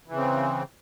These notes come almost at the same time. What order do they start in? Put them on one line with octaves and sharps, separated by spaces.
E3 C#3 C4